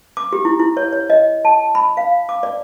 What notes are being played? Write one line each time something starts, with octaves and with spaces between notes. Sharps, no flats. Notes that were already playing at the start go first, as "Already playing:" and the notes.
D6
G4
E4
E4
C#5
C#5
D#5
A5
B5
F5
D6
D5